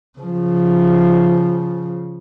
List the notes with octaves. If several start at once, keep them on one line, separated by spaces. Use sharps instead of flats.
C#3 F3